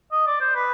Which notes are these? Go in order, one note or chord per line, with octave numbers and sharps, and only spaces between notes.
D#5
D5
C5
B4